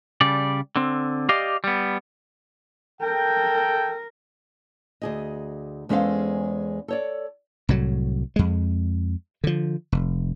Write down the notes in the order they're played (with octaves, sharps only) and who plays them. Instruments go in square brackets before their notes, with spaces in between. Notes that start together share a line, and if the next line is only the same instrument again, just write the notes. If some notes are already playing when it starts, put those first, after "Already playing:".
[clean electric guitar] C#3 G3 D5
D3 C4
G4 D5 D#5 F5
G3 B3
[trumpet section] A4 G5 [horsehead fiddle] A#4
[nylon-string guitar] D2 G#4 D#5
E2 G#3 C#4 A4 C5 F5
A4 C#5 D5
[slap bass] C2 A2 F#3
F2 G#3
D3 F3
F1